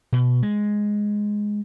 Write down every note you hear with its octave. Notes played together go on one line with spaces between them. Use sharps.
B2
G#3